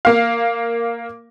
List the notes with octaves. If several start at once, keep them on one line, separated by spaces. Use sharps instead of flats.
A#3 F5